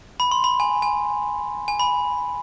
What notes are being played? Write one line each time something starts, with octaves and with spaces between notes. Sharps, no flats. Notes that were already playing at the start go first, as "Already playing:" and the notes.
B5
C6
B5
G#5
G#5
G#5
B5